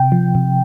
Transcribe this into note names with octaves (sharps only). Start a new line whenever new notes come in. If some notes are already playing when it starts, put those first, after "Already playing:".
Already playing: C3 G5
F3
C3